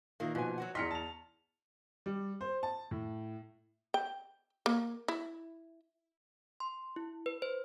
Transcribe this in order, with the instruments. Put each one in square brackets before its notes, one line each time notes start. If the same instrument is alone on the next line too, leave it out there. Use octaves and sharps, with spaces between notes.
[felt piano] A#2 [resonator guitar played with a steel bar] D#3 E3 A#3
[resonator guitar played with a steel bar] G#2 G#5 [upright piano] B2 F3 B3
[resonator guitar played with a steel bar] F#3 F#4 F#5
[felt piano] E2 F6 B6 [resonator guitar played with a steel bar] D#5 [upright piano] C6 C#7
[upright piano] A5 F7
[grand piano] G3
C5
A5
A2
[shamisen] G5
A#3
E4
[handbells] C6
E4
B4
C5